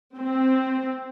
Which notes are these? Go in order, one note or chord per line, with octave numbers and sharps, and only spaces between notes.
C4